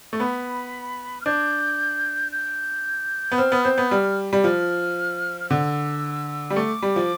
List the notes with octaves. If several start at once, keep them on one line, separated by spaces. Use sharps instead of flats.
A3
B3 B5
F6
D4 G6
G6
B3
C4 F6
B3
C4 G6
B3
G3 F6
G3
F3 F6
F6
D3 E6
G3
A3 D6
G3
F3